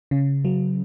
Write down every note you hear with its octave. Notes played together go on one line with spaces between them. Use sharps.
C#3
F#3